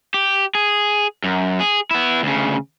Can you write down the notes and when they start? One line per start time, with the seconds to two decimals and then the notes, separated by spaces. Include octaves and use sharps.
0.14 G4
0.55 G#4
1.24 F#2
1.60 G#4
1.91 B3 E4
2.23 D2 C#3